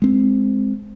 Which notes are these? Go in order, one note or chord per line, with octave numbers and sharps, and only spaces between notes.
G#3 C4